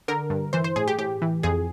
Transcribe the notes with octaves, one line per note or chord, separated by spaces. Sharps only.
D3 A#4
G2
E3 C5
C5
A2 G#4
G4
A2 G4
E3
F2 G#4